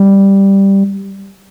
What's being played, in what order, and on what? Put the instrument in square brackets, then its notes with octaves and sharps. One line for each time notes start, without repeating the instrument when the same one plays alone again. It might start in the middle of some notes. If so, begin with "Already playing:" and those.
Already playing: [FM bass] G3